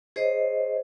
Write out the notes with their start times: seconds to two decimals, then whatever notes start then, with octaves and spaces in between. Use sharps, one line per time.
0.16 G#4 C5 C#5 D#5